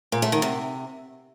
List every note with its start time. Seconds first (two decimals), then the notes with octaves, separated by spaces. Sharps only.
0.12 A#2
0.22 A3
0.32 D#3
0.42 C3